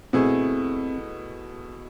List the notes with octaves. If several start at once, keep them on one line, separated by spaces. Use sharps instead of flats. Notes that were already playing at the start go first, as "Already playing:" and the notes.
B2 A3 C4 E4 G#4